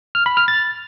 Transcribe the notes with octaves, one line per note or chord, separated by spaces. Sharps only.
F6
B5
F6
A6